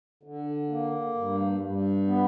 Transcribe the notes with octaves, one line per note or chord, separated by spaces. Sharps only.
D3
A#3
G2
G2
B3